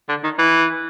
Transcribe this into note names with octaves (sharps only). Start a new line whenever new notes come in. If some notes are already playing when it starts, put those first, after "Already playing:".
D3
D#3
E3